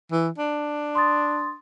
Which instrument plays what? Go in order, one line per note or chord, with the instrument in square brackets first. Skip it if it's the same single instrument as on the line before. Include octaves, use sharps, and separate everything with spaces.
[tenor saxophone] E3
D4
[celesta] C6 D#6 A6